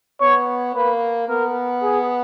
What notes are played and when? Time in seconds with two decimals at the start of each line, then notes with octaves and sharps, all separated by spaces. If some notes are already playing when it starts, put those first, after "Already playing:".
0.21 B3 C#5
0.74 A#3 B4
1.29 B3 A#4
1.82 G#4